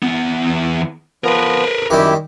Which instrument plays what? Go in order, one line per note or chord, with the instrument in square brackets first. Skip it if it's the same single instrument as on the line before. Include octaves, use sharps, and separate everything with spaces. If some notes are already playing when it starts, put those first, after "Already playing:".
[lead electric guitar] E2 B3
[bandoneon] F3 B3 [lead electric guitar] A#4 B4
[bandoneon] F#2 E4 G4 [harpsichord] D#3 G3